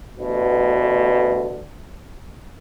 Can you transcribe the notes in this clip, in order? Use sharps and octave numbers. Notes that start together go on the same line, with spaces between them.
A1 D2 B2 D3